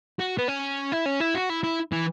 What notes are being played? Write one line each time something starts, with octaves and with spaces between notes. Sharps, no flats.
F#4
B3
C#4
E4
C#4
E4
F#4
E4
E4
E3